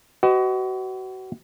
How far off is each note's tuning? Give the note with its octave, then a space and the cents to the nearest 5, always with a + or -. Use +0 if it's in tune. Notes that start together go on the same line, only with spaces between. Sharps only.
F#4 +30 B4 +45 D#5 +0